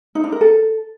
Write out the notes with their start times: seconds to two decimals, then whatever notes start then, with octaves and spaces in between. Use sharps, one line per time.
0.15 D#4
0.24 D4
0.32 A#4
0.41 A4